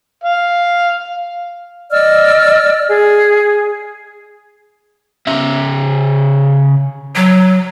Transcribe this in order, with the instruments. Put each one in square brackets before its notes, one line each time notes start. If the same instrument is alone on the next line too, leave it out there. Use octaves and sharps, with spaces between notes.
[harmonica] F5
[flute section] D5 D#5 E6 F6
G#4
[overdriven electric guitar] C#3 E5
[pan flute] F#3